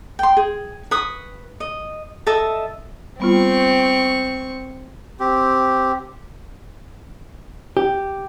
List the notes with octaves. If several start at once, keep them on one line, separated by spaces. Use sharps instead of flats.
G5 C6
G#4
B4 C#6 D#6
D#5
A4 D#5 E5 A5
G3 B3 C4 F4 C#6
C4 G4
G4